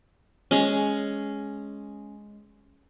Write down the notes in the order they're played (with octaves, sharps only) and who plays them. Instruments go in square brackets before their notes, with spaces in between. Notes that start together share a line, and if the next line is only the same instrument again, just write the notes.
[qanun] G#3 C#4